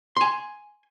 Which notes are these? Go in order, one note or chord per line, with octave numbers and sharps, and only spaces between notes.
G#5 C6